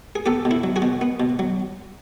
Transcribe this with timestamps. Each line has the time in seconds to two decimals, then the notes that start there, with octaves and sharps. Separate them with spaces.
0.16 G#4
0.26 B3 G4 A4
0.45 B2
0.51 E4
0.64 F#3
0.76 F#4 G#4
0.82 B2
1.01 B3
1.20 B2
1.39 F#3